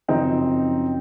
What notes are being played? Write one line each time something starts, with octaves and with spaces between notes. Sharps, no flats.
F#2 C#3 F3 C4 D#4